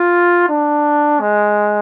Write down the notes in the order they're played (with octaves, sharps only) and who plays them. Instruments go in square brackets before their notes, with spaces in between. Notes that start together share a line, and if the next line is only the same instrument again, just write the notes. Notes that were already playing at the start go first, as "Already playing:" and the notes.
Already playing: [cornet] F4
D4
G#3